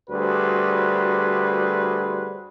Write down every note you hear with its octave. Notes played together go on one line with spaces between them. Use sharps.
D2 G3 F#4 G#4 B4 C5